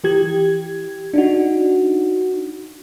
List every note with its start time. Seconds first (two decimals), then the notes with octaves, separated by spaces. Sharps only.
0.04 E3 G4 G#6
1.14 D4 D#4 F#4